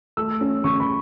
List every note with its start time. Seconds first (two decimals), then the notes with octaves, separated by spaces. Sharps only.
0.17 A3 E6
0.41 C#4
0.64 C#3 C#6
0.80 B5